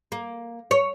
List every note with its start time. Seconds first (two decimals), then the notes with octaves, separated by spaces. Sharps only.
0.12 A#3
0.71 C#5